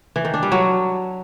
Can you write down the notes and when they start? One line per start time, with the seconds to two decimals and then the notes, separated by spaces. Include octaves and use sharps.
0.16 E3
0.25 D#3
0.34 D4
0.43 G3
0.52 F#3